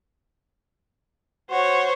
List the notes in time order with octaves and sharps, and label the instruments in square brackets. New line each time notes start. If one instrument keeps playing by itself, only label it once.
[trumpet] F#4 [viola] C5 C#5